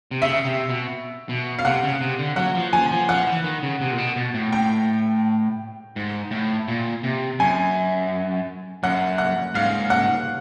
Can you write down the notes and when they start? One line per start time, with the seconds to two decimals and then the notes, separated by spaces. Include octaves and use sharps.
0.11 C3
0.22 C#3 E5
0.45 C3
0.69 B2
1.29 B2
1.59 F5
1.65 C3 F#5
1.83 C#3
2.01 C3
2.19 D3
2.36 F#3 F#5
2.55 F3
2.73 F3 G#5
2.91 F3
3.09 F3 F#5
3.27 E3
3.44 D#3
3.63 C#3
3.81 C3
3.92 A#2
3.98 B2
4.16 B2
4.34 A2
4.52 G5
5.96 G#2
6.31 A2
6.68 A#2
7.03 C3
7.39 F#2 G#5
8.83 F#2 F#5
9.18 F#5
9.54 G#2 F5
9.90 F#5